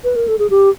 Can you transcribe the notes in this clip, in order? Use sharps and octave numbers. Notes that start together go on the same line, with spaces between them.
B4
A#4
A4
G#4
G4